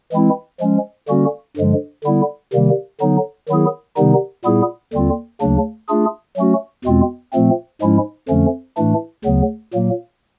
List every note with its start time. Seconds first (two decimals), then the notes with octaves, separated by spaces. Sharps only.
0.12 E3 G#3 C4 E4
0.60 F3 G#3 C#4
1.09 D3 G3 A#3 C#4 F#4
1.57 G2 D3 F3 G#3
2.04 D3 G3 B3 E4
2.53 C3 D#3 G3 A#3
3.01 D3 F#3 B3 D#4
3.49 D#3 F#3 B3 E4 G#4
3.97 C3 D#3 G3 B3 D#4
4.45 A#2 G3 B3 E4 G#4
4.93 D#2 D3 G3 C4 F4
5.41 D2 C#3 F#3 A#3 D4
5.88 A3 D4 F4 G#4
6.36 F#3 A3 C#4 F#4
6.85 E2 B2 G#3 C4 F4
7.33 A#2 F3 A3 C4
7.81 G#2 F3 G#3 C#4 E4
8.28 F2 D3 F3 A3 C#4
8.77 A2 E3 A3 D4
9.24 D2 C#3 F#3 B3
9.74 A#2 F#3 A#3